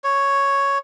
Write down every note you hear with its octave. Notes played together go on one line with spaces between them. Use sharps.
C#5